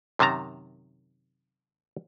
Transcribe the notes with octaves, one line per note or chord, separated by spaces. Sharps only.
F#2 C3 D#3 A5 A#5